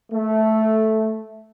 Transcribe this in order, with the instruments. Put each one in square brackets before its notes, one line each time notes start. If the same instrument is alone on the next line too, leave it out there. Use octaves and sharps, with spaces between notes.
[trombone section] A3